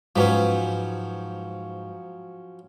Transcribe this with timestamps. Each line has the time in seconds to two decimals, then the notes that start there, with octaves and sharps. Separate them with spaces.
0.16 G#2 F3 F#3 C#4 B4 G#5